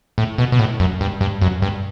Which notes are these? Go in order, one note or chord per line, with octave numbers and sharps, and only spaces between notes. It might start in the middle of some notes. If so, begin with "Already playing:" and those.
A2
B2
B2
A2
F#2
G2
G2
F#2
G2